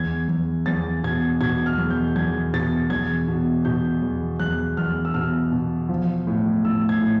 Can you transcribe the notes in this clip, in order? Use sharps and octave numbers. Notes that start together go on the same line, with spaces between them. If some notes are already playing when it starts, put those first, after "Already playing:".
Already playing: E2 G#6
E2
E2 A6
B2 G#6
B2 G#6
F6
E2
G6
E2 G#6
B2 A6
E2 G#6
B2
B2 G6
E2
E2 F#6
E2 F6
E6
B2 F6
B2
F3
A2
A2 E6
G#6
A2